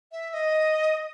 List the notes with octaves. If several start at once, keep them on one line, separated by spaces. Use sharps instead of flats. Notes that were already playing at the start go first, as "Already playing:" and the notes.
E5
E5
D#5